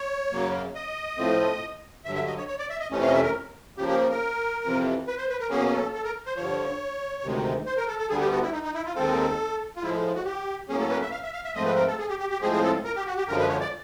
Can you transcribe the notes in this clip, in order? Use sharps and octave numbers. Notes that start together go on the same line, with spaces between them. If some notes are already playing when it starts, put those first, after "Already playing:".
Already playing: C#5
F#2 C#3 F#3 A#3
D#5
A2 F3 A3 C4
G2 D3 F#3 E5
E5
D#5
C#5
C#5
D5
E5
D#5
F2 C3 E3 A3 C#4
F5
D#5
E5
A#4
C#3 F3 A#3 G4
G4
A#4
F2 C3 E3
B4
C5
B4
A#4
B2 F#3 A#3 C#4 G#4
G#4
A4
A4
A#4
C5
G2 D3 F3 C#5
D2 C3 D#3 G#3
C5
A#4
A4
A4
D2 D3 G3 B3 G#4
G4
F#4
E4
D#4
D#4
E4
F4
D#2 D#3 G#3 C4 A4
F4
A2 F3 G#3 E4
F#4
G4
A2 F#3 A#3 C#4 G#4
A4
B4
E5
F5
E5
F5
E5
G#2 F3 A3 C4 D#5
B4
A#4
A4
G#4
G4
G4
G4
A2 F3 G#3 C4 G#4
G#4
A4
A#4
G4
F#4
G4
F#2 D3 F3 G#3 A#4
B4
C#5
D5